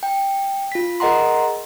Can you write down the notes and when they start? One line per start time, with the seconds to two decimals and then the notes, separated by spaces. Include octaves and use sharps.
0.03 G5
0.72 F4 B6
1.00 G#4 A#4 D#5 F#5 A#5 C6